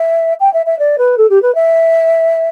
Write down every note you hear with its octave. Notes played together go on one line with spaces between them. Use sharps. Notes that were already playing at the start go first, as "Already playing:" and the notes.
Already playing: E5
G5
E5
E5
D5
B4
A4
G4
B4
E5